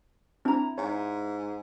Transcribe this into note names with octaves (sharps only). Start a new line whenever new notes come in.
C4 D4 E4 A#5
G#2 C#5